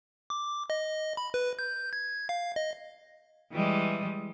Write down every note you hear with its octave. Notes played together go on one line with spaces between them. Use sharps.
D6
D#5
B5
B4
G6
G#6
F5
D#5
E3 G3 G#3